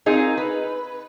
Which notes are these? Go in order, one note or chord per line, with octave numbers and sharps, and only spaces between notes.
C4 D#4 F4 G#4 A#4
B4